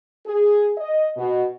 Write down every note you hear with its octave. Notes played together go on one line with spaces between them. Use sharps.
G#4
D#5
B2